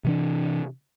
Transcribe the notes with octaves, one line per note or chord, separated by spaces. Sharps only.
C3 E3 D4